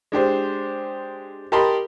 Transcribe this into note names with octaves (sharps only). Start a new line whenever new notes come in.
G#3 D4 G4 C5
G4 A#4 D#5 A5 B5 C6